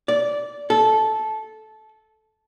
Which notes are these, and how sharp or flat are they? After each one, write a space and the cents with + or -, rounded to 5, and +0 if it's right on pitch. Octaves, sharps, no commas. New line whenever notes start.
D5 -15
A4 -15